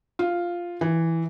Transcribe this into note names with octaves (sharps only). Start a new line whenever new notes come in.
F4
E3